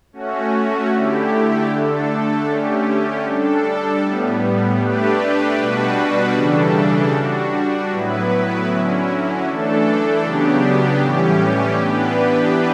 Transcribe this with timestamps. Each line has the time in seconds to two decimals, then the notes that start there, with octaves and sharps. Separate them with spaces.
0.13 A3 C#4 F#4
0.91 D3 A3 E4 G4
1.68 D3 A3 D4 A4
2.46 D3 A3 C#4 G4
3.23 G3 D4 A4
4.01 A2 G3 B3
4.79 A3 D4 G4 B4
5.57 B2 G3 D4 F#4 B4
6.35 C#3 E3 G3 D4 A4
7.12 G3 D4 F#4
7.90 A2 F#3 B3 E4 B4
8.67 D3 F#3 C#4 E4
9.45 E3 A3 D4 A4
10.23 C#3 F#3 B3 D4 G4
11.00 A2 E3 G3 C#4 G4
11.78 E3 B3 D4 G4 B4